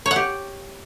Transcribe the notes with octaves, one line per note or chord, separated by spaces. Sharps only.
C#5
F#5
G4